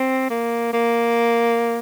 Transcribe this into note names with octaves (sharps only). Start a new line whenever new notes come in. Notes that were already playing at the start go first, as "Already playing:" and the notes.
Already playing: C4
A#3
A#3